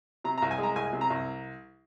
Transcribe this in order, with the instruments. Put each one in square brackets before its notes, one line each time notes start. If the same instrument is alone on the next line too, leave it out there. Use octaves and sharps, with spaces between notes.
[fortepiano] C3 A#5
A#5
C2
G#5
G#3 A#5
C2 G#5
C3
A#5
C2